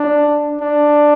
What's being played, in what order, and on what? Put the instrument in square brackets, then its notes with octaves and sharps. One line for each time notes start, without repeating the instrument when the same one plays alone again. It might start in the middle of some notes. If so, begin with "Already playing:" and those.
Already playing: [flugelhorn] D4
D4